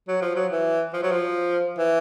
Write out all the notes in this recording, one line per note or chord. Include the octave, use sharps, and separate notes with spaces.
F#3
F3
F#3
E3
F3
F#3
F3
E3